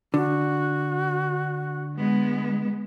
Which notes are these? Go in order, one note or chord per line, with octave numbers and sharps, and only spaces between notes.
D3 F#4
G#3 B3